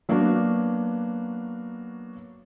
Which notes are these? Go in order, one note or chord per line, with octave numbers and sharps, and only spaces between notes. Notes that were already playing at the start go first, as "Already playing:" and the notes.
F#3 A#3 B3 D4 F#4